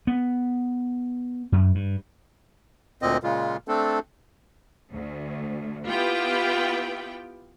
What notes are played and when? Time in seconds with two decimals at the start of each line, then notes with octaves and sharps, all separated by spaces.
0.07 B3
1.52 F#2
1.75 G2
3.02 D2 A#2 C4 D#5
3.23 A#2 C#3 G#3 F4
3.68 A3 C4 D4 A4
4.92 D2
5.88 B3 E4 F4 G4 B4 G5